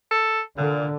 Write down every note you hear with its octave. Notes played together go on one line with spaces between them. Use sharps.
A4
A#2 D3